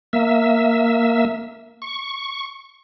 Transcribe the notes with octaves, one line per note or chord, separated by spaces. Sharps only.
A#3 E5
C#6